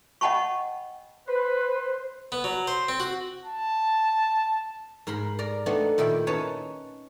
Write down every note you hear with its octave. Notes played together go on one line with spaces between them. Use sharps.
D#5 F#5 G5 A5 B5 C#6
B4 C5
B3
F#3
C5
C4
F#4
A5
G#2 A#4 B5 C6
A#4 D5 A#5
A3 B3 C4 D4 D#4
A#2 D#3 E4 E5 G5
C#4 D#4 B4 C#5 A5